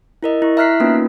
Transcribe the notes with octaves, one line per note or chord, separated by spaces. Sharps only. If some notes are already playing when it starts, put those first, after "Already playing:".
E4 A#4 D#5
E4 C#6
E5 A#5 F6 F#6 B6 C7
A#3 B3 C#4 D#4 F4 B4